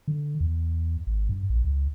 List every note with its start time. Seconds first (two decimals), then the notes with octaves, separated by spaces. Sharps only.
0.08 D3
0.40 E2
1.07 G#1
1.29 G2
1.50 A#1
1.64 C#2